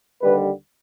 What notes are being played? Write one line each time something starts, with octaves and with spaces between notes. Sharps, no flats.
D#2 D3 G3 B4